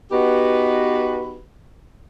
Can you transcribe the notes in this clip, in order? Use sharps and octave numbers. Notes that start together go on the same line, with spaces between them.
B3 D#4 F#4 G4 B4